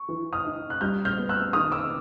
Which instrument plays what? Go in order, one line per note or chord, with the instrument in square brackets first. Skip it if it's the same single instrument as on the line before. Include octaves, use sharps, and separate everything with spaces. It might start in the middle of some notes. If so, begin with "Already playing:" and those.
Already playing: [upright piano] C#6
[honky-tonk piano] E3
[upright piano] D#6 F6
[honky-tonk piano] D#4
[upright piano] F#6
[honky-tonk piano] G3 [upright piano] F6 G6
[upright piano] F6 G6
[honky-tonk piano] B3
[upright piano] E6 F#6
[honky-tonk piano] D#3 [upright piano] D#6 F6
[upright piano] D6 E6